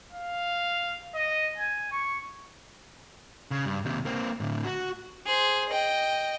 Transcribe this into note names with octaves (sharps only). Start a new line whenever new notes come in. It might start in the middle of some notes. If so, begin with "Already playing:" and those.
F5
D#5
G#5
C#6
C#3
G2
D#2 C3
A#3 C4
A2 D3
F#4
G#4 C5
D#5 G5